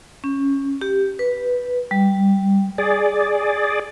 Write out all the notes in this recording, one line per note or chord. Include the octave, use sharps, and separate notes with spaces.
C#4
G4
B4
G3
G#4 D5